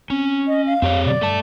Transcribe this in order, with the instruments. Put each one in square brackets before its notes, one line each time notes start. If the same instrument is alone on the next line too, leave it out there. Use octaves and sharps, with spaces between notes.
[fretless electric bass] C4 [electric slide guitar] C#4
[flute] D#5
F5
[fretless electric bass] F2 [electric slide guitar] C4 G4 C#5
[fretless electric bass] B2 D3 F#3 [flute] D5
[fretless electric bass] G2 [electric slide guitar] A3 A5